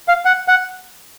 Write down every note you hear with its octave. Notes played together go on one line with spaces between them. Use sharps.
F5
F#5
F#5